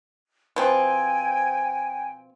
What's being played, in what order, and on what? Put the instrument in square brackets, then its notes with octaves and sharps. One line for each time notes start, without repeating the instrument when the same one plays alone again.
[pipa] B2 F3 C4 [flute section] G5 G#5